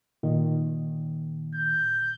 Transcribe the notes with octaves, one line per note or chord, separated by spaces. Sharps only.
A#2 D#3
G6